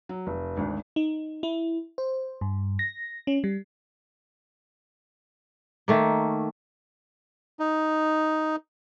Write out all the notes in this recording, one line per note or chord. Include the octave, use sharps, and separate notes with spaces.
F#3
F1
G#1 D2
D#4
E4
C5
G2
A#6
C#4
G3
D#3 A3 A#3
D#4